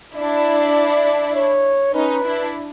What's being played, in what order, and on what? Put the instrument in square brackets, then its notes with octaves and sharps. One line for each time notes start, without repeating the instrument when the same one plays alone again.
[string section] D4 E4 [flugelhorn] D5
[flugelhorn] C#5
[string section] C#4 D#4 [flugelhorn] B4
[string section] D4 E4